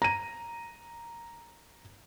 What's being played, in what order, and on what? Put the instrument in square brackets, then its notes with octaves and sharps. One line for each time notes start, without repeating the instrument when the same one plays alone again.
[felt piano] A#5 D#7